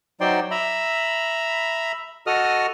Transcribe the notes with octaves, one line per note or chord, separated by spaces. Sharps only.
F#3 D#4 C5 D5 G5 C6
E5 A#5 B5
F#4 A4 D#5 D#6 F6